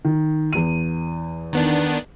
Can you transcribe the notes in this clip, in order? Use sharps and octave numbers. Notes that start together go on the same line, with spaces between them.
D#3
E2 D#7
D#3 B3 D4